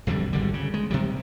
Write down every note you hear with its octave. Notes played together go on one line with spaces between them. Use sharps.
B1 F2 D3 G3
G#1 D3 G3
C#3
G#3
C3 D#3 G3